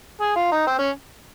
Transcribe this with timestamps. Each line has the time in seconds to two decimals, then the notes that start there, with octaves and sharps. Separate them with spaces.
0.21 G#4
0.36 F4
0.52 D#4
0.67 C4
0.79 C#4